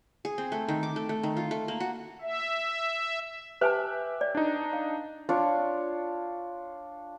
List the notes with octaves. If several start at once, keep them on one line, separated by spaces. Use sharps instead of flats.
G#4
C4
A3
D#3
D6
A3
A3
D#3
F4
A3
A#3
F#4
E5
G4 B4 E5 G#5 A5 F#6
D5
D4 D#4
F5
D4 F4 C#5